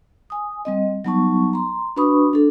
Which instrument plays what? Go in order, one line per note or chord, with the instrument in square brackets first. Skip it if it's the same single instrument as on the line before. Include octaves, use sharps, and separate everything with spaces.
[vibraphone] G#5 D#6
G3 C4 D#5
F#3 G3 B3 D#4 A5 C#6
A#5 C6
D4 F#4 B4 B5 C#6 D#6
D4 A4